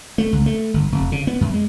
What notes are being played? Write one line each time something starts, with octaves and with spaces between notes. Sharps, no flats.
A3
C#2
A3
G1
F1
C#3
B3
F#2
G#3